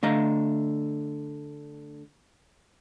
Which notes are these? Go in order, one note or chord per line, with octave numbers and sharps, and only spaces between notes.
D3 A3 D#5 F5 A#5